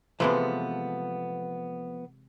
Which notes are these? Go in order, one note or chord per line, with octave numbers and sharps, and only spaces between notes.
C3 E3 F3 G#3 A3 B3